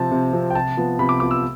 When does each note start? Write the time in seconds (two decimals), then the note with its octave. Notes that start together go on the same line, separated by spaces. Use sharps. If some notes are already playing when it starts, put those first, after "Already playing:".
Already playing: C3 F3 C4 A5
0.12 C3
0.33 F3 C4
0.50 G5
0.55 C3 A5
0.77 F3 B3
0.99 C3 B5
1.09 D6
1.20 F3 B3 D6
1.31 E6